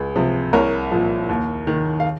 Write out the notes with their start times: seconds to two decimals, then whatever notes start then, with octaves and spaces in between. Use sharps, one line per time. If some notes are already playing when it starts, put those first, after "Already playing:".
Already playing: C#2 G#4
0.16 C3 F3
0.53 C2 A#4 C#5
0.91 A#2 F3
1.29 D#2
1.67 D#3
2.00 F5